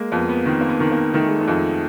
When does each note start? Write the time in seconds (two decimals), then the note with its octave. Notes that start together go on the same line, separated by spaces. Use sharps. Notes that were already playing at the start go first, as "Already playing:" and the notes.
Already playing: G#3 A#3
0.12 F2 B3
0.29 B3
0.45 D#3 C4
0.61 A#3
0.69 B3
0.80 D#3
0.92 A#3
1.14 D#3 A3
1.27 G#3
1.41 A3
1.48 F2